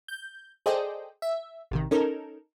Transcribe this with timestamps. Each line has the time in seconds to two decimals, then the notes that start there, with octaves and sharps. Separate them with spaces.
0.08 G6
0.66 G#4 A4 C5 D5 D#5 G5
1.22 E5
1.71 A1 C3 D#3
1.91 C#4 D#4 A4 A#4